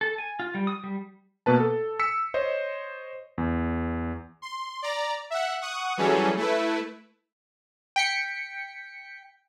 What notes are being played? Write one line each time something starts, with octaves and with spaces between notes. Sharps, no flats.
A4
G#5
F4
G3
D#6
G3
B2 A#3 B4 A5
A4
E6 B6 C#7
C5 C#5 D#5
E2
C6
D5 A#5
E5 F#5
F#5 C#6 D#6
E3 F#3 G3 C#4 G#4 A4
A3 E4 B4
G5 B6 C#7